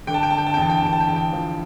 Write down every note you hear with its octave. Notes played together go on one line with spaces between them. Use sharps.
D3 G5
A5
G5
D3 A5
G5
A5
G5
E2 A5
G5
A5
E2 G5
A5
G5
E2 A5
G5
F3